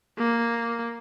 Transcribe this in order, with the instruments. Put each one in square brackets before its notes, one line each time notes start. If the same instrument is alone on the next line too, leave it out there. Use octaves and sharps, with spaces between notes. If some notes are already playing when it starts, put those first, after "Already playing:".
[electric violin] A#3